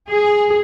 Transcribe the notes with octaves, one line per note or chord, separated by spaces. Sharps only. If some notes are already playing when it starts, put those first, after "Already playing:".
G#4